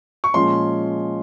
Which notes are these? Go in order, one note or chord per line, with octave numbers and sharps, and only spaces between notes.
C#6
A#2 F3 G#3 C#4 C6